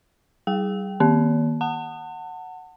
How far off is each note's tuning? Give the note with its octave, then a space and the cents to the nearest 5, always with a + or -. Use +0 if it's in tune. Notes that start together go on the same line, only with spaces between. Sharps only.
G3 -25 G#4 +0 G5 -5
D#3 +0 A#3 +25
F#5 +0 A5 +35